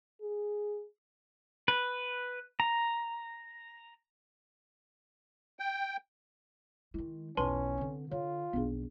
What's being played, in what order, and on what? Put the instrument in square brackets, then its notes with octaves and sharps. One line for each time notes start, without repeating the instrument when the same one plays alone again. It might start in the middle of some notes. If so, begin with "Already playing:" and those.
[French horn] G#4
[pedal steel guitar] B4
A#5
[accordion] G5
[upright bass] D#3 G#3 [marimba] E4
[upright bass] B1 E2 [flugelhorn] C#4 [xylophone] B4 A5 C6
[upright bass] D3 C4
[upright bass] D3 [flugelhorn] F4 [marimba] C#5
[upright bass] B1 F2 [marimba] B3 D4 G#4